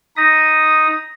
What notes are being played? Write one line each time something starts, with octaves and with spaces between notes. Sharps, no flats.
D#4 D#6 A#6 B6